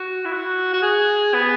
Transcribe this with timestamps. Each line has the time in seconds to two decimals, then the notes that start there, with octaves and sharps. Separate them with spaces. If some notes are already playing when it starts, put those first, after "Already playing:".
Already playing: F#4
0.25 E4
0.32 F#4
0.73 F#4
0.82 G#4
1.34 B3